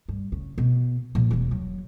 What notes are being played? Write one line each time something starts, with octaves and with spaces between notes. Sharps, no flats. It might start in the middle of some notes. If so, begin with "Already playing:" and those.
G2
C#3
B2
A#2 F3
E1 E2
F#3